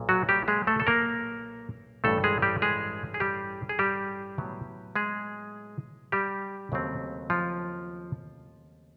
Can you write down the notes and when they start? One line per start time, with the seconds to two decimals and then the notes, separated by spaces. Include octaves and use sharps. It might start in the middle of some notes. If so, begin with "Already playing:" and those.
Already playing: B1 A#2
0.09 F#3 F#4
0.29 G3 G4
0.48 G#3 G#4
0.67 A3 A4
0.80 A4
0.87 A#3 A#4
2.04 A1 G2 E3 G3 A3 A4
2.24 G#3 G#4
2.42 G3 G4
2.62 G#3 G#4
3.14 G#4
3.20 G3 G4
3.69 G#4
3.79 G3 G4
4.38 A2 F#3 B3
4.96 G#3 G#4
6.12 G3 G4
6.72 D#2 C#3 F#3 A3 C4
7.30 F3 F4